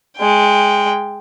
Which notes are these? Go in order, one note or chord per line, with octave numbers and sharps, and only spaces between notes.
G#3 G5